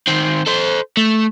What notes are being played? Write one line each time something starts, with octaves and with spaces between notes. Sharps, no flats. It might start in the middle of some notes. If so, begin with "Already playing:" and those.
D#3 C4
A4 C5
A3